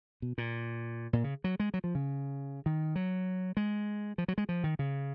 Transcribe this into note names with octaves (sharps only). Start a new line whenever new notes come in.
B2
A#2
A#2
C#3
F#3
G#3
F#3
F3
C#3
D#3
F#3
G#3
F3
F#3
G#3
F3
D#3
C#3